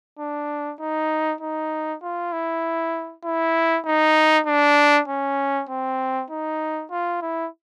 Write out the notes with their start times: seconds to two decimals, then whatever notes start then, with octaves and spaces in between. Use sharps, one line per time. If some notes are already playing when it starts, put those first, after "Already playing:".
0.19 D4
0.80 D#4
1.41 D#4
2.02 F4
2.33 E4
3.24 E4
3.85 D#4
4.46 D4
5.08 C#4
5.69 C4
6.30 D#4
6.91 F4
7.22 E4